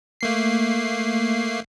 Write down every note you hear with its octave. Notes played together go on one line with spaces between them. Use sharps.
A3 A#3 C7